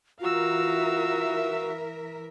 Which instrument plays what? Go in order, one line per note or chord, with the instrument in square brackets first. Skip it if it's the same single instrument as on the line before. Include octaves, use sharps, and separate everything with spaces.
[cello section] E3 A#4 E5 [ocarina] F4 [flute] F#4 [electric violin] F5 E6